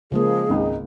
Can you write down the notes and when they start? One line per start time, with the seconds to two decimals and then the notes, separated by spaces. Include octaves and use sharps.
0.12 C#3 F3 G#3 A#3 G#4
0.49 G#1 C#2 G#2 D#4